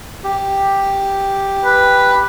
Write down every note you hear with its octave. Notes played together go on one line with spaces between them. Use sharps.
G4
B4